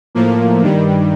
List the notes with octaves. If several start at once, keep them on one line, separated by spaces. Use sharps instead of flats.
A2 F3 A#3
G2 D#3 G3